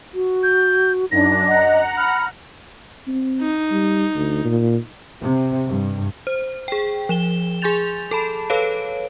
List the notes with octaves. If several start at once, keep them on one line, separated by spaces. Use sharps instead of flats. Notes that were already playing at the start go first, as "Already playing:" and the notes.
F#4
G6
F#2 D4 D#4 A#6
D#5 F#5 A#5
B5 F6
C4
D#4
G3
D2
A#2
C3
G2
C5
G#4 G5
F3 E7 G7
G#4 G#5 C6 G6 A6 F7
A4 A5 B5
A4 B4 C#5 F5 D7